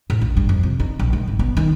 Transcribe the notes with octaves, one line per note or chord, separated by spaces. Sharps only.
A2
A#1
G2
F2
C3
D#4
A#1
G#3
G#1
B3
D#3